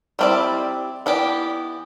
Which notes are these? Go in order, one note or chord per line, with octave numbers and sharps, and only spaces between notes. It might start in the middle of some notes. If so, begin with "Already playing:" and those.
G3 C4 E4 B4 D5
E3 B3 E4 G4 D5